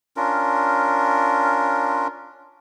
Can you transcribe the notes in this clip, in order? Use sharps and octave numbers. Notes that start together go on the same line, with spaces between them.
C#4 D4 F4 A#4